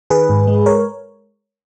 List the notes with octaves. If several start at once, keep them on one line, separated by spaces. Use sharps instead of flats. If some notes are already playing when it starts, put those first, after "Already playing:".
D#3 G#4 B4
G#2
G#3
A#4 C#5